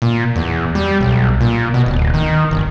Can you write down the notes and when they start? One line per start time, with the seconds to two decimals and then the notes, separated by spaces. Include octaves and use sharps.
0.02 A#2
0.36 E2
0.75 G3
1.01 B1
1.41 A#2
1.74 B2
1.86 D1
2.14 D#3
2.51 G1